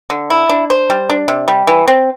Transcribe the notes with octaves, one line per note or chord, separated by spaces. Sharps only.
D3
E4
D4
C5
G3
D4
C3
G3
E3
C4